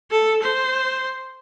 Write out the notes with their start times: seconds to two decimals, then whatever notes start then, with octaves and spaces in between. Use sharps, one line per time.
0.11 A4
0.42 C5